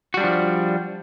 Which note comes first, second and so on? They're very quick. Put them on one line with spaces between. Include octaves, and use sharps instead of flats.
F#4 G3 D4 F3